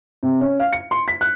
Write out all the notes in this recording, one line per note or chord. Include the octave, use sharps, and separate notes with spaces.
C3
C#4
F5
C#7
C6
B6
F#6